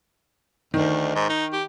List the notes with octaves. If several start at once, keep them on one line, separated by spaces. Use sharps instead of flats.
D2 D#3
G#2
D#4
G4